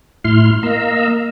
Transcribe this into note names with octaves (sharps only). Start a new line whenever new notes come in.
A2 E4 C6 F6
A#3 D#5 F5 A#5 E6